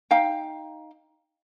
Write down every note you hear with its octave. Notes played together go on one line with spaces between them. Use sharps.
D#4 F5 G5